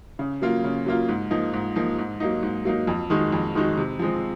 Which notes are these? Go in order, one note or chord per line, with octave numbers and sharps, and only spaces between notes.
C#3
F#3 A#3 F4
C#3
F#3 A#3 F4
G#2
F3 A#3 D#4
G#2
F3 A#3 D#4
G#2
F#3 A#3 D#4
G#2
F#3 A#3 D#4
F2
D#3 G#3 D#4 F#4
F2
D#3 G#3 D#4 F#4
C3
F3 G#3 C4